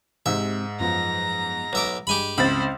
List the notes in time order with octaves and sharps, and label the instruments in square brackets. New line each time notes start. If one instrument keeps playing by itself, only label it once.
[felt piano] G#2 [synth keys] C3 G#3 [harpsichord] E5
[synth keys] F#2 F3 B3 [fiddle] A#5
[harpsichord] B1 E5 D6
[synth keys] G2 G#3 [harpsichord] G4 G#5 B5
[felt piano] C#2 C4 A6 [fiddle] E4 C5 [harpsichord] B5